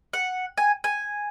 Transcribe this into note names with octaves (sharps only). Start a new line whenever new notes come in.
F#5
G#5
G#5